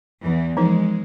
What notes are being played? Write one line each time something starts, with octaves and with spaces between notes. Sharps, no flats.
E2 E3
E3 F3 G#3 D#4